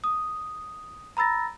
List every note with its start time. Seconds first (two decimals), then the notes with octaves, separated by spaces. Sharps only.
0.04 D#6
1.17 A#5 B5 E6 A6 A#6